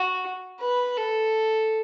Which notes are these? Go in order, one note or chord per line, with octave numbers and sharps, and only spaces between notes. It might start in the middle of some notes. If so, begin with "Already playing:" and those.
Already playing: F#4
B4
A4